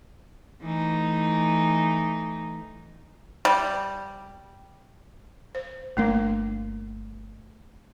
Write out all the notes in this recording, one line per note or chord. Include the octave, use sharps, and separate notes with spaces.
E3 A3 D#4
G3
C5
G1 A3 A#3 D4